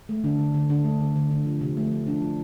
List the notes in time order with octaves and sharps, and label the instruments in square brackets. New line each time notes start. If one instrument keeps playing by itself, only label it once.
[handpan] A3
D3 D4
D3
D3
D3 D4
A3
D3
D3
D3
F3
C3
A3
F3
C3 D4
F3